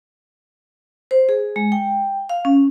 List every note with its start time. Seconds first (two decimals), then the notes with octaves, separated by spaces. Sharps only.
1.11 C5
1.29 G#4
1.56 G#3
1.72 G5
2.30 F5
2.45 C#4